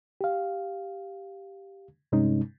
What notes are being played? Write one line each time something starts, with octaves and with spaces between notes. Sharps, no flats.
G4 F5
G2 C3 G#3 C#4 D#4